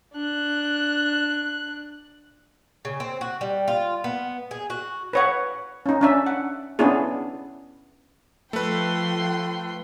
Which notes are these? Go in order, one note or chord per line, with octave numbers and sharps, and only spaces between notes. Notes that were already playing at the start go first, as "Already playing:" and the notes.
D4 F#6
C#3
C4
F#4
G3
F4
B3
G#4
F#4
B4 C#5 F#5
C#4 D#4
C#4 D4 E5
F#5
B3 C#4 D4 E4 G#4
F3 A3 B4 G5 C6